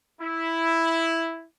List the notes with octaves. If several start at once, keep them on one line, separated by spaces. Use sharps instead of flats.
E4